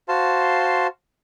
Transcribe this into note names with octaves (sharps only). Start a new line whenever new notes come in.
F#4 C5 F5 A5 C6